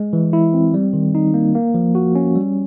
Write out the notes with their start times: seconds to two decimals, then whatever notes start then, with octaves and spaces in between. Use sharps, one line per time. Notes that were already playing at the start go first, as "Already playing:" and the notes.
Already playing: G#3
0.13 E3
0.33 E4
0.54 C4
0.74 G3
0.93 D#3
1.15 D#4
1.34 A#3
1.55 A#3
1.74 F3
1.95 F#4
2.15 C#4
2.35 G3